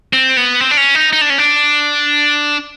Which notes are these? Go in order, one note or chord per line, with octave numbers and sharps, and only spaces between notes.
C4
B3
C4
D4
C#4
D#4
D#4
D4
C#4
D4